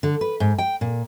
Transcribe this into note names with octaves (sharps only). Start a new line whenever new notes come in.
D3
B4
G#2
G5
A#2